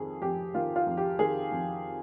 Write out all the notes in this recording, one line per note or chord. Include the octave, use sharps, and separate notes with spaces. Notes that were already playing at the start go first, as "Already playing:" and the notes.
Already playing: F2 D#3 G#4
F2 G4
D#3 F4
F4
F2
G4
D#3 G#4
F2